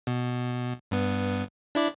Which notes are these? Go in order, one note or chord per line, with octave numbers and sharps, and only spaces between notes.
B2
G2 B3
D4 E4 D5